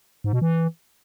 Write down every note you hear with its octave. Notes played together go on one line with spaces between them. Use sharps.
G#2
B2
E3